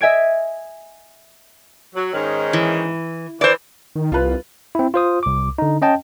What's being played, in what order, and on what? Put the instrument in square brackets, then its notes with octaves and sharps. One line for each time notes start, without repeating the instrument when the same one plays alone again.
[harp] D#5 E5 G#5 G#6 D7
[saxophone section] F#3
G#2 D#3 C#4
[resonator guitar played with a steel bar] E3
[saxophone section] E3 [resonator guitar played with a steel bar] C5 D5
[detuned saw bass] D#3
[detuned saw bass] C2 [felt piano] F4 B4
[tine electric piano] C4 E4
F4 C5 D#6
C2 D6
D3 D#4
C#4 D#5 G5 A5